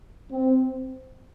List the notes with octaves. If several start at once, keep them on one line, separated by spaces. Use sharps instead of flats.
C4